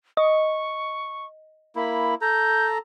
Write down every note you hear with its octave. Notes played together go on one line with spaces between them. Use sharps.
D#5 C#6
A#3 E4 B5
A4 A#5 G6